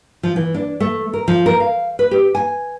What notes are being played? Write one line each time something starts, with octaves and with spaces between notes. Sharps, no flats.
F3
E3
D4
A3
A#4
F3
A#4
F5
B4
G4
G#5